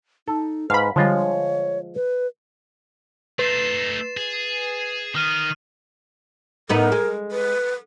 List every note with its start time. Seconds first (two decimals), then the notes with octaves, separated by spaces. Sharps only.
0.28 D#4 A4
0.70 G#2 B4 F5 B5
0.96 D3 F3 G3 G#3 F4 C#5
1.95 B4
3.39 A3 D#4 B4 A6 C7 E7
4.17 G#4
5.15 D#3 D#6 F6 D#7
6.69 A2 B3 D#4 A#4
6.92 G#3
7.32 B4